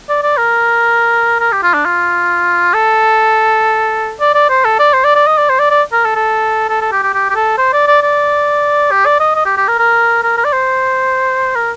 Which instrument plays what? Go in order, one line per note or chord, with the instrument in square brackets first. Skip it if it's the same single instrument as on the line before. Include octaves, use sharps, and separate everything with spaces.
[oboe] D5
D5
A#4
A#4
G4
F4
D4
F4
A4
D5
D5
C5
A4
D5
C5
D5
D5
D#5
D5
C5
D5
D5
A#4
A4
A4
A4
A4
G4
G4
G4
G4
A4
C5
D5
D5
D5
G4
D5
D#5
D#5
G4
G4
A#4
A#4
A#4
A#4
D5
C5
A#4